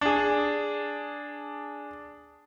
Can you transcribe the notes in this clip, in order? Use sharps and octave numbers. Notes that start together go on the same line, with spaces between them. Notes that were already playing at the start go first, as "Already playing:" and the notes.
D4 G#4